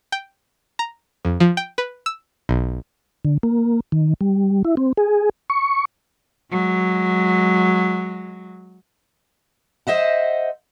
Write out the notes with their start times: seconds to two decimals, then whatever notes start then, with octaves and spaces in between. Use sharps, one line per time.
0.12 G5
0.79 A#5
1.25 F2
1.40 F3
1.57 G5
1.78 B4
2.06 E6
2.49 B1
3.25 D3
3.43 A#3
3.92 D#3
4.21 G3
4.65 E4
4.77 C4
4.97 G#4
5.50 C#6
6.51 F#3 G#3
9.87 C5 D#5 E5 F#5